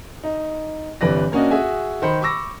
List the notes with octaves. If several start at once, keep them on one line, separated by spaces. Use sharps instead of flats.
D#4
G1 C3 E3 B4 D5 A#6
A#3 C#4 D4 F#4 D#5
F#4 G#4 E5 G#5
D#3 C5 B5 C#7
B5 C#6 D6 E6 A#6